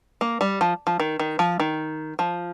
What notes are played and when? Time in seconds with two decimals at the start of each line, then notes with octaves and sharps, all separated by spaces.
0.21 A#3
0.41 G3
0.61 F3
0.87 F3
1.00 D#3
1.19 D#3
1.39 F3
1.60 D#3
2.19 F3